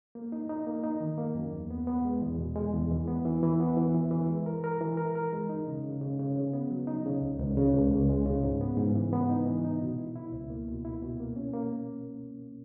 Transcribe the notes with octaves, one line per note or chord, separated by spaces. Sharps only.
A#3
D#4
D#4
A#3
D#4
D#3
A#3
F#2
E2
B3
B3
G#3
E2
B2
G#3
E2
E3
B3
E3
E3
B3
E3
E3
E3
G#3
A#4
A#4
E3
A#4
A#4
G#3
D#4
C#3
C#3
C#3
C#3
C#3
B3
F#3
D#4
C#3
C#2
C#2
C#3
C#2
C#2
G#3
C#3
G#2
B3
G#2
E3
B3
D#4
E3
D#4
B2
E4
E4
C#2
A#3
B2
E4
B2
A#3
C#4
A#3